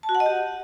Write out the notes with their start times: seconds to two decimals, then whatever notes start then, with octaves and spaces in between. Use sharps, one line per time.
0.03 A5
0.09 F#4
0.15 F#5
0.20 D#5
0.26 G4